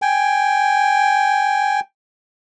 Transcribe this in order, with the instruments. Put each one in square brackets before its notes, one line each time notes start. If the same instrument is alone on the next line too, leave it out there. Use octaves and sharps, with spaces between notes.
[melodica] G5 G#5